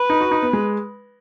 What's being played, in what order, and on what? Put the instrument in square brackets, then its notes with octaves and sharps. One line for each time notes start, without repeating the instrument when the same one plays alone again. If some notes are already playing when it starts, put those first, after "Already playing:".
Already playing: [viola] B4
[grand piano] D#4
F#4
D#4
B3
G#3